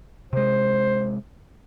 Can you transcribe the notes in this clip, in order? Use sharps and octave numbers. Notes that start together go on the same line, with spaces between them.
C3 G#3 C5